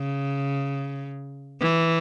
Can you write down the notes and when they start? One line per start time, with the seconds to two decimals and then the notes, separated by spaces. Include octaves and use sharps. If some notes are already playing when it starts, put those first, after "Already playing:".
Already playing: C#3
1.61 E3